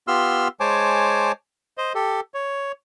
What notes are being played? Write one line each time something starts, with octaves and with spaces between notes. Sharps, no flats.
B3 F4 G4 C6 E6 F6
G#3 C5 C#5 G#5 A5 D6
C5 D#5
G4 A4
C#5